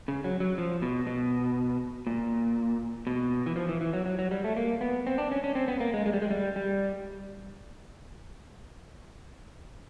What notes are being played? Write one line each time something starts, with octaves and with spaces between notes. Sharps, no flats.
C#3
F#3
F#3
F3
B2
B2
A#2
B2
E3
F3
E3
E3
F#3
F#3
F#3
G3
A3
A#3
B3
C4
D4
C#4
C#4
C4
B3
A#3
G#3
G#3
G3
G#3
G3
G3